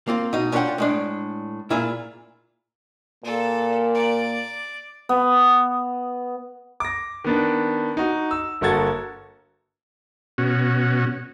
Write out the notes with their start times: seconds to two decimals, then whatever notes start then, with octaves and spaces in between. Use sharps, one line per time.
0.08 A#3 C4 F4
0.33 B2 D#4
0.52 C#4 D4 F4 A4 F#5 G5
0.78 A2 G#3 D4
1.70 A#2 E4 F4 G#4 E5
3.24 A#2 A#3 A4
3.95 D5
5.09 B3
6.80 D6 A#6
7.24 D#3 B3 D4
7.97 D#4 F#4
8.31 E6
8.61 G1 A#3 F#4 A4 G#6 A6
10.38 B2 C#4 F#4